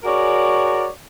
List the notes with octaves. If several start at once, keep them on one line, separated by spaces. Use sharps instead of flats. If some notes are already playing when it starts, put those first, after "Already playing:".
F#4 G#4 A#4 C#5 D5